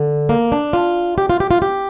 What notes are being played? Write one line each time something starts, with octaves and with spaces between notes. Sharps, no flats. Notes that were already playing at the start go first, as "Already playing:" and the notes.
Already playing: D3
A#3
D4
F4
G4
F4
G4
F4
G4